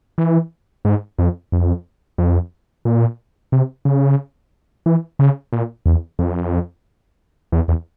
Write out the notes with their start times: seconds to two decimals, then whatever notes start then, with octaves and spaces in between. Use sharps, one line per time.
0.18 E3
0.85 G#2
1.19 F2
1.52 F2
2.18 F2
2.85 A#2
3.52 C3
3.85 C#3
4.86 E3
5.19 C#3
5.53 A#2
5.86 E2
6.19 F2
7.52 E2
7.68 E2